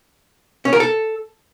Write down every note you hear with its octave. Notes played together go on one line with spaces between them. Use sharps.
C#4
A#4
A4